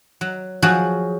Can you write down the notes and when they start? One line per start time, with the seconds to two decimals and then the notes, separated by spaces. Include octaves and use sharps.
0.21 F#3
0.62 F3 F#3 F#4 G#4